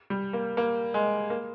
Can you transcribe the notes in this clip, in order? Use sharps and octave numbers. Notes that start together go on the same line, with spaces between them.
G3
A#3
A#3
G#3
A#3